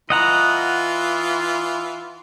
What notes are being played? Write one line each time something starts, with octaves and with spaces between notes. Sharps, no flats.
E3 F4 D#5 F#5 A#5